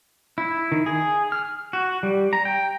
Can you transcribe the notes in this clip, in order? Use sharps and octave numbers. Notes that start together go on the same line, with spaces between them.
E4
D#3
G#4
F6
F#4
G3
A#5
G5